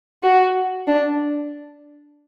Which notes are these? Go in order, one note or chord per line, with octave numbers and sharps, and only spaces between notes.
F#4
D4